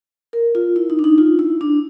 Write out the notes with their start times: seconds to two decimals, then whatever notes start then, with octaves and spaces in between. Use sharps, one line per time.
0.33 A#4
0.55 F4
0.76 E4
0.90 D#4
0.99 D4
1.04 D#4
1.18 F4
1.39 E4
1.61 D4